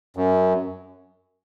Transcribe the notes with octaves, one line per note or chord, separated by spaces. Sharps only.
F#2